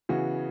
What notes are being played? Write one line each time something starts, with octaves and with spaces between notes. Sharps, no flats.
C#3 E3 B3 F#4